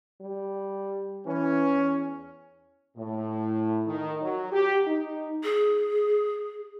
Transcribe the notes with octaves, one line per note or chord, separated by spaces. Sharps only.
G3
E3 C#4
E2
A2
D#3
F#3
G4
D#4
G#4